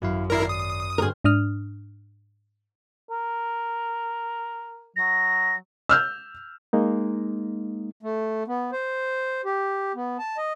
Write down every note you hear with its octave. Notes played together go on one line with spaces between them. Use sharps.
G#1 F#2 E4 F#4 F5
G#1 E4 A#4 D5 C7
D#6
G2 D3 F#4 G#4 A#4 C5 F6
G#2 D4 D#6 F6
A#4
F#3 A#6
E6 F6 G6
G#3 A#3 D#4
A3
B3
C5
G4
B3
A5
D#5